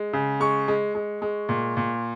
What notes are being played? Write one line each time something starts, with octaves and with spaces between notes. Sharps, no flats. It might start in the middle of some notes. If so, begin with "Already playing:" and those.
Already playing: G#3
C#3
G#3 C#6
G#3
G#3
G#3
A#2
A#2